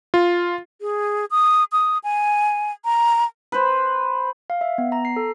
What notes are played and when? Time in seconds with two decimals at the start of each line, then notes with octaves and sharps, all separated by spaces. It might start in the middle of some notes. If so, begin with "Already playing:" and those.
0.14 F4
0.81 G#4
1.31 D#6
1.72 D#6
2.04 G#5
2.85 A#5
3.52 B4 C5
4.50 F5
4.61 E5
4.78 B3
4.92 A#5
5.05 C7
5.16 A4